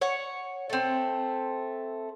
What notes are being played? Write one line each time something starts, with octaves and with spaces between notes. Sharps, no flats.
C#5 F#5
A3 C4